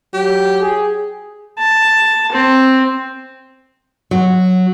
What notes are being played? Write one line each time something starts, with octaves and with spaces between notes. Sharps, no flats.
F#3 G4
G#4
A5
C4
F#3